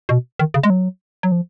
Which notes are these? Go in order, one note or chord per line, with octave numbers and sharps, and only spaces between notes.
B2
D#3
C#3
G#3
F#3
F#3
F3